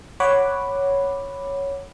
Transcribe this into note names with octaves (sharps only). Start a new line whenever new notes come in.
C#5 F#5 B5 D6